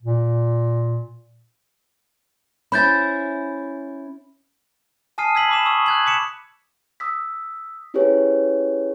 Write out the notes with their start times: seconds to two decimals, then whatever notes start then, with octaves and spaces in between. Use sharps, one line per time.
0.03 A#2
2.72 C#4 E4 C5 B5 G6 A6
5.18 G#5 A5 D#6 F6 C7 D#7
5.35 E6 G#6 B6 F#7
5.49 B5 D6 E7
5.66 C#6 D#6 E6
5.86 F#6 G#6 F#7
6.06 D6 B6 C#7 E7
7.00 D#6 E6 B6
7.94 C#4 E4 G4 G#4 B4 C#5